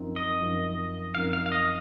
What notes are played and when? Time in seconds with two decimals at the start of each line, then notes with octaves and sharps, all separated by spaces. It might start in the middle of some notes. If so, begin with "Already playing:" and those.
Already playing: F#2 F3 C4 D#4 A#4
0.16 D#5
0.41 F#2 F3 C4 D#4 A#4
1.15 F#2 F3 C4 D#4 A#4 F5
1.33 F5
1.46 F5
1.52 D#5